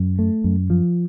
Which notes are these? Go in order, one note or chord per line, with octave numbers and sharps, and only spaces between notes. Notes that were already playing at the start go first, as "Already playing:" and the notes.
Already playing: F#2
A3
F#2
F3